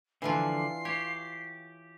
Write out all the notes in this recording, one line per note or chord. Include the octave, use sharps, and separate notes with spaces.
D3 E3 F3 D4 F4 C7
G4 C#5